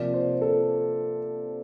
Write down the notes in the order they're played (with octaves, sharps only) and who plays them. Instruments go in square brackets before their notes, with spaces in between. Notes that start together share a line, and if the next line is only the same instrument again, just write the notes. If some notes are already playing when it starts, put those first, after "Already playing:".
Already playing: [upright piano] C3 F3 A#3 D5
C5
A4